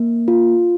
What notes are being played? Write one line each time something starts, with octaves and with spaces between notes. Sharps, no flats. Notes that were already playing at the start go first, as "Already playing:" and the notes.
Already playing: A#3
F4